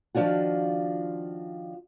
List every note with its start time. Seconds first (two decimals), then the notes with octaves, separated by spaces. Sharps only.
0.15 D#3 F3 F#3 D4 F4 F#4